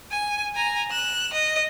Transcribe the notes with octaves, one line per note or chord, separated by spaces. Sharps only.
G#5
G#5 A#5
F#6 E7
D#5